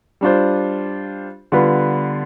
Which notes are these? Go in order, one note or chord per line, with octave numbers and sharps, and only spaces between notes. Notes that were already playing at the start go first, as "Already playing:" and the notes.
G3 D4 F4 C5
D3 G3 B3 F4 B4